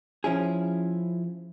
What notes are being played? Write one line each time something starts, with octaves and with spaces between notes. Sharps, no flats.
F3 C#4 E4 G#4